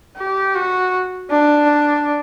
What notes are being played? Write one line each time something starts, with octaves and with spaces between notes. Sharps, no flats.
G4
F#4
D4